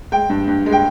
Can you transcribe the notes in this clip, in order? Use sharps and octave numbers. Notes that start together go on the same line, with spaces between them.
G#3 G5
G2
G2
G#3
G5